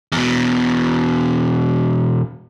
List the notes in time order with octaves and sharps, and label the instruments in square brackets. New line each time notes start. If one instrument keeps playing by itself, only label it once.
[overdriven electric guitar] E2 B2